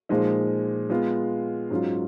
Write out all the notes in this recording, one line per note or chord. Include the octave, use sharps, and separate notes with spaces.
A#2 F3 G#3 D#4
G#3 B3 F4
G#2 F#3 C#4 F4